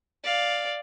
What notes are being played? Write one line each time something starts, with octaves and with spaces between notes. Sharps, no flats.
D5 F5